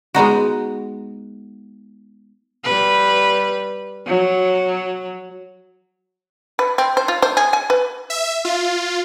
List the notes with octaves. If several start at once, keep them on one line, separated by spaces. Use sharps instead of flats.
G#3 B3 D#4 F#4
G3 B4
F#3
B4
C4
C5
F4
C5
G#4
G#5
B4
E5
F4